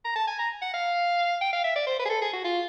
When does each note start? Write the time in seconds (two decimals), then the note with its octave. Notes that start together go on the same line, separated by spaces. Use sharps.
0.05 A#5
0.16 A5
0.27 G#5
0.39 A#5
0.62 F#5
0.74 F5
1.41 G5
1.53 F5
1.64 E5
1.76 D5
1.87 C5
1.99 B4
2.05 G#4
2.10 A4
2.21 G#4
2.33 F#4
2.44 F4